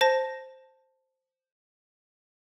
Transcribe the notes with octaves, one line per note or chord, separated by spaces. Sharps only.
C5 A5 A#6